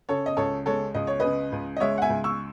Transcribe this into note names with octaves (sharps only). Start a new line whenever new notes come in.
C#3 A4 C#5
D#5
C#2 A4 C#5
G#3 A4 C#5
C#2 D#5
C#5
C#3 B4 D#5
C#2
D#5
G#3 C#5 E5
F#5
E5 G#5
C#2
C#6 E6